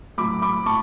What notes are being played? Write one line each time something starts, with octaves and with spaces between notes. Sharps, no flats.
A2 F#3 A3 B5 D6
B5 D6
A2 A5 C#6